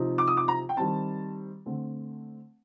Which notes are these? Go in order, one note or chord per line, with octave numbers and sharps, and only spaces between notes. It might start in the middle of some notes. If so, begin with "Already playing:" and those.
Already playing: C3 F3 C4 D#4
D6
D#6
D6
A#5
G5
D#3 G3 C4 A5
D3 A3 C4